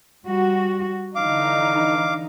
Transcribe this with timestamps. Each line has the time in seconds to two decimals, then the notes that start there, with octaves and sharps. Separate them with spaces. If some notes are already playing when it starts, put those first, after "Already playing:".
0.25 G3 F#4
1.16 D3 E3 D#4 F5 D6